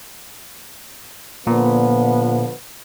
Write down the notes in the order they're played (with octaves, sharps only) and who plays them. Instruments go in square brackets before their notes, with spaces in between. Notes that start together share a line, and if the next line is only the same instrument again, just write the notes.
[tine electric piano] A#2 [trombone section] D3 F3 B3